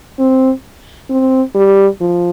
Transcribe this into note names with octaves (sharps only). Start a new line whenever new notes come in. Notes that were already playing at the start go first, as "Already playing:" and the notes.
C4
C4
G3
F3